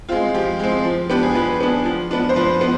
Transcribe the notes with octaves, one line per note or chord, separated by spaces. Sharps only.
G#3 C4 F4
F3 G4
G#3 C4
F3
B3 D4 G4
G#4
F3 B4
B3 D4
F3
B3 D4
C5
F3 B4
B3